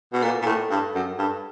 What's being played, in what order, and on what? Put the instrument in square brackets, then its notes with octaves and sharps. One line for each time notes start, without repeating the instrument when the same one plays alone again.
[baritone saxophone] B2
[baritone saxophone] A#2 [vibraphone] A4
[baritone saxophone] A#2
A2
G2
F#2
G2